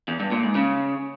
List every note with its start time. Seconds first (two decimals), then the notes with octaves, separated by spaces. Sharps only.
0.08 E2
0.20 G2
0.32 A#2
0.43 G#2
0.55 C#3